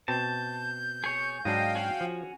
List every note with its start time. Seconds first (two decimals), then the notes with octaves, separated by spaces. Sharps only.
0.08 B2 C4 A5 G6
1.04 G#4 C#5
1.45 G#2 F#3 D4 D#5 F5 G5
1.75 C#4 F#4 G#4
2.01 F3